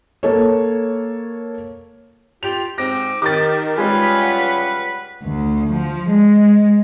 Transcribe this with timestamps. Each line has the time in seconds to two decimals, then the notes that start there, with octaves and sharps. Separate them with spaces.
0.23 A#3 A4 C#5
2.43 F4 G4 F7
2.78 G#2 C4 D6 A#6
3.22 D#3 G4 D6 A6
3.78 G3 G#3 C#4 F4 B4 G#5
4.22 F#5
5.24 D2
5.72 F3
6.10 G#3